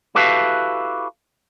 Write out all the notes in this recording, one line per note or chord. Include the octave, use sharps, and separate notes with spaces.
E4 F#4 G4 A4 B4 F5